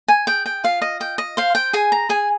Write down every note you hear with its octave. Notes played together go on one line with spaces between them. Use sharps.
G#5
G#4 G5
G5
F4 F5
D#5
D#5 G5
D#5
C5 F5
G5
G#4 G#5
A#5
G#4 G#5